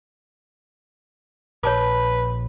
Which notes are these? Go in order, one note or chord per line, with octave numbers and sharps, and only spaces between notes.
A#1 B4 C#5 A5 D6